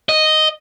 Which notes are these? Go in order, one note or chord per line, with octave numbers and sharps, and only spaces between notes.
D#5